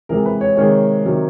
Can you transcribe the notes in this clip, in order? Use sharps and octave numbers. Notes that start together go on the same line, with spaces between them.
C3 E3 G#3 A#4
B4
C#5
C3 D#3 G#3 C#5
C3 D#3 F#3